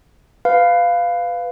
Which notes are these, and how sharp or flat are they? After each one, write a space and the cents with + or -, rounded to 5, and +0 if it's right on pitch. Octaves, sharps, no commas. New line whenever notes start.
B4 +15 F5 +0